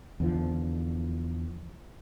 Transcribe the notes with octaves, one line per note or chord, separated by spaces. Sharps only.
E2 D3 F3